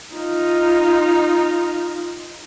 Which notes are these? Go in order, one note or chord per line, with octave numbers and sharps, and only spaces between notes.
D#4 F4